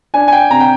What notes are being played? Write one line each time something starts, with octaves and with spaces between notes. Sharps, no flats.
D4 G#5
G#5
G5
C3 A#5
G5